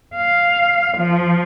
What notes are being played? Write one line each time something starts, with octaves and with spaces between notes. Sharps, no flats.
F5
F3